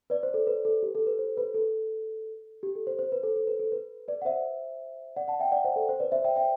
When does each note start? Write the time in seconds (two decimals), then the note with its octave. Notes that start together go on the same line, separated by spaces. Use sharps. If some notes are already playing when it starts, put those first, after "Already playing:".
0.10 B4 D5
0.23 C5
0.34 A4
0.47 B4
0.65 A4
0.83 G4
0.95 A4
1.06 B4
1.19 C5
1.37 B4
1.54 A4
2.63 G4
2.75 A4
2.87 C5
2.99 C5
3.12 B4
3.23 A4
3.36 A4
3.47 B4
3.60 A4
3.72 B4
4.08 B4 D5
4.22 F#5
4.25 C5 E5
5.17 D5 F#5
5.28 F#5 A5
5.40 E5 G5
5.52 D5 F#5
5.64 C5 E5
5.76 A4
5.89 C5
6.00 B4 D5
6.12 C5 E5
6.24 E5 G5
6.36 E5 G5